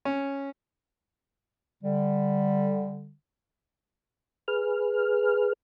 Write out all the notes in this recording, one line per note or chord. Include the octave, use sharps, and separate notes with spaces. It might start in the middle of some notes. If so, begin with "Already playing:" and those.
C#4
D3 G3
G#4 B4 F6